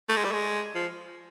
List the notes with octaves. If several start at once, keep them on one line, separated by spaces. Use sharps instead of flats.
A3
G#3
G3
G#3
F3